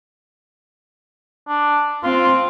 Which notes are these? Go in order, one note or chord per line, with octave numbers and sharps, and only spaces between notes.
D4
C4 F4